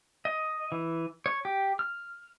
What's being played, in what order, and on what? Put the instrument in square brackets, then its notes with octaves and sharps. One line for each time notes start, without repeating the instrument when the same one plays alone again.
[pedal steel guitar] D#5
E3
C#5
G4
F6